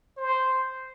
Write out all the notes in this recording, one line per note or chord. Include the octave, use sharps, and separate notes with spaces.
C5